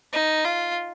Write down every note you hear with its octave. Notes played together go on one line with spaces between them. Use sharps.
D#4
F4